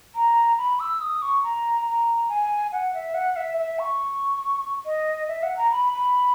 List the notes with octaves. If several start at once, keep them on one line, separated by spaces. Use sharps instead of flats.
A#5
B5
E6
D#6
C#6
A#5
A#5
G#5
F#5
E5
F#5
E5
E5
C#6
D#5
E5
F#5
A#5
B5
B5